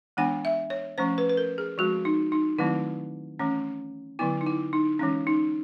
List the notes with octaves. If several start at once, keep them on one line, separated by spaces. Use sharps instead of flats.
E3 G#3 B3 D4 F#5
E5
C#5
F3 A3 C#4 C5
B4
B4
A#4
G#4
F3 G#3 C4 F#4
D#4
D#4
D#3 F#3 A3 C4 E4
E3 A3 C#4
D3 F#3 B3 E4
D#4
E4
D#4
E3 G#3 C#4
D#4